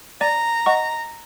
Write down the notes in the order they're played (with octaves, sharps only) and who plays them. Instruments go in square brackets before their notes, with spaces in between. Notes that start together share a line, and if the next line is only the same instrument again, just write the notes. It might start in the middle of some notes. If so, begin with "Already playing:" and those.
[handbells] D5 [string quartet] A#5
[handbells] D#5 F#5 C#6